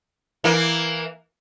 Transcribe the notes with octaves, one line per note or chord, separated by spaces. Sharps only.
E3 A#3